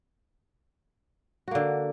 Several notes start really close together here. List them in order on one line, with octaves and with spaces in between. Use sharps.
F#4 A#3 D3